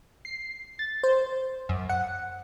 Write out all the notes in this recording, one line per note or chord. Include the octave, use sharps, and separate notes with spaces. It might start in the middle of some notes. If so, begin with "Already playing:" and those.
C7
A6
C5
F#2
F#5